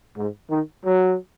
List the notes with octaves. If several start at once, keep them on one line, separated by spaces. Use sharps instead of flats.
G#2
D#3
F#3